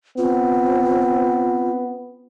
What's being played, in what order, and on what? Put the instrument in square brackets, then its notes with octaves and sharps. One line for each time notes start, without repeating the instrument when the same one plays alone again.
[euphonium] B3 [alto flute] C4 [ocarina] F4